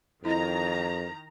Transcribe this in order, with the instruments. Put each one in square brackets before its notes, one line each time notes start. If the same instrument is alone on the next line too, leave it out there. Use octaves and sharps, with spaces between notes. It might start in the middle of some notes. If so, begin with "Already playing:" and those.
[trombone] F2 [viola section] D#3 A#5 [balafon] E4 D#5